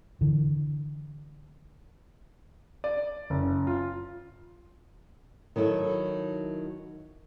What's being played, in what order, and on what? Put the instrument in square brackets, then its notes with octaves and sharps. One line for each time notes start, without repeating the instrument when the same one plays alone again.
[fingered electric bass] D3 E3
[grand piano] D5
F#1
F4
[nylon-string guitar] D#3 F#3 E4 A4